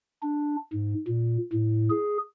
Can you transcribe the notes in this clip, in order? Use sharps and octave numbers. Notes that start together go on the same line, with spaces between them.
D4
G#2
A#2
A2
G#4